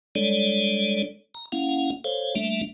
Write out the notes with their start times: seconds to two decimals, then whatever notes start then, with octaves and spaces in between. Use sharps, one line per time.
0.15 G3 G#3 D4 A4 C#5 D5
1.35 A#5
1.52 A#3 C#4 E4 F5 F#5
2.04 A4 C5 C#5 F5
2.35 G3 A3 A#3 D4 E5